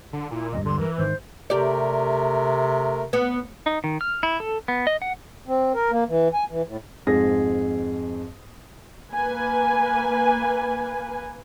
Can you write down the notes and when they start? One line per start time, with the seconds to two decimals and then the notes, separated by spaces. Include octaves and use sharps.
0.13 D3
0.31 A#2 E4
0.52 E1 D2 G2 D#5
0.65 D3 C6
0.79 E3 A#4
0.98 G#1 G#2 D#3 C5
1.50 C3 A3 G4 A#4 D5
3.13 B3
3.66 D#4
3.84 D#3
4.01 F6
4.23 E4
4.40 A4
4.68 B3
4.87 D#5
5.02 F#5
5.48 C4
5.74 A#4
5.91 A#3
6.08 E3
6.34 G#5
6.50 E3
6.67 A2
7.07 F2 G#2 G#4 A#6
9.12 A#3 B4 G#5